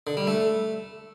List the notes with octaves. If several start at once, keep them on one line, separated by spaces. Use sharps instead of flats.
D3
G3
A3